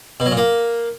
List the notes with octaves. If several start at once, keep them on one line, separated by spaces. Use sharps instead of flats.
B2
F#3
A#2
A#3